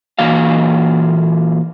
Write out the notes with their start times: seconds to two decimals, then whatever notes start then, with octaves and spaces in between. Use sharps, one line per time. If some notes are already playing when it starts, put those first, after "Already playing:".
0.19 A#2 E3 A#3 F#4 F5